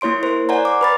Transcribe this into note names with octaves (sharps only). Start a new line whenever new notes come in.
A#3 E4 C#5 C6 D7
A#4 C5 C6
C#5 D5 F#5 G#5 A#5
A#5 D6
B4 B5 A6